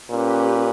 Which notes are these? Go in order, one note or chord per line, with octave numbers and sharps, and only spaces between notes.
A#2 C#4 G4 B4